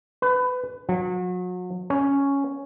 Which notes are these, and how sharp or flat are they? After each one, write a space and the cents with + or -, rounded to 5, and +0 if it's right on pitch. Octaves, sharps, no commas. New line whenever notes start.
B4 +25
F#3 -35
C#4 +5